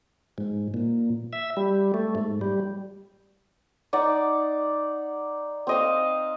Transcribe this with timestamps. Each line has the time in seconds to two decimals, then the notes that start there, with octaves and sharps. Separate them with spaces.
0.38 G#2
0.74 A#2
1.33 E5
1.57 G3
1.94 A3
2.15 G#2
2.41 G3
3.93 D#4 D5 F#5
5.67 C4 D#5 F5